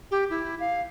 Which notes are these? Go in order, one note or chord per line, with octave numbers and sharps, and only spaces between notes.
G4
E4
F5